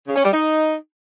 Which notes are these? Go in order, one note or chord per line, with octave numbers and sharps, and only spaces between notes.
C#3
C#4
G3
D#4